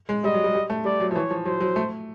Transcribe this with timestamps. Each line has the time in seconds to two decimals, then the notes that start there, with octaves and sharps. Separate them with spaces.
0.09 G#3
0.24 G3 D#5
0.34 F#3
0.44 G3
0.55 G3
0.70 A3
0.85 G3 D5
1.00 F#3
1.11 F3
1.15 E3 C#5
1.31 F3
1.45 F#3 C5
1.60 F#3
1.76 A3